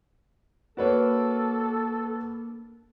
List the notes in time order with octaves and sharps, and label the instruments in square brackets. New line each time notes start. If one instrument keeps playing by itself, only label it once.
[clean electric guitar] A#3 D4 [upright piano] F#4 B4 C#5 [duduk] A4